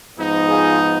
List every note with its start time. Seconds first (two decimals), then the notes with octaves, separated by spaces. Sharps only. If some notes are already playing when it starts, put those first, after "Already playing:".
0.17 G#2 F3 B3 D#4
0.48 F4 G#4